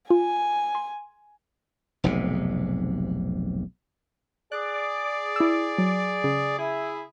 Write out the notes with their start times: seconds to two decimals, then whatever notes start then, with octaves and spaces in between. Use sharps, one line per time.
0.10 F4 G#5
0.75 C6
2.04 F1 B1 G#2 C3
4.52 G#4 D5 F#6
5.36 E4 E6
5.78 F#3
6.24 C#3
6.58 E4 G#4